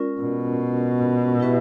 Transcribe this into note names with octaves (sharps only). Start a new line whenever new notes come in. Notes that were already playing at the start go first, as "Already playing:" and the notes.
Already playing: G#3 C#4 F4 A#4 D5
B2
E4 G4 B4 E5